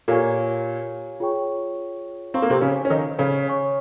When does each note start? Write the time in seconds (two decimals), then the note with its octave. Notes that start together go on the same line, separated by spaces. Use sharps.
0.08 A#2 A#3 G4 C#5 F5 G#5 C#6
1.20 F4 G#4 C#5 G5 C#6
2.34 C4 C5 F5 A#5 C#6
2.42 A#3
2.50 C3 C4
2.61 C#3 C#4
2.85 C#4
2.90 D#3 D#4
3.19 C#3 C#4
3.47 C#5 G#5 C#6